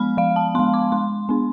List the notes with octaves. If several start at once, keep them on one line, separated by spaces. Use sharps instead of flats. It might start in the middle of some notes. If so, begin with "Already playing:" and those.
Already playing: F3 G#3 B3 B5 F6
F3 F5
A5
G#3 B3 C6
D6
G#3 C6
B3 D4